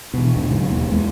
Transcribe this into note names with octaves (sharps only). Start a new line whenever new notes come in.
B2 E3
D2 G#2 B2 D3
G#2 C#3 F#3
E1 D#2 A#3
E2 G#3